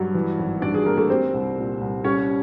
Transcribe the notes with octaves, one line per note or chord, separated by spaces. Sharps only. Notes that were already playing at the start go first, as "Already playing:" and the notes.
Already playing: G2 F#3
E3
G#1
G2 D4 D5
G#4
A3 A#3 A#4
A3 A4
G3 C4 C5
C2
A#2
C2
G3 C#4 C#5